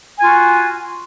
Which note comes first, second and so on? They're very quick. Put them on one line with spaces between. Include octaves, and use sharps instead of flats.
G#5 F4 F#4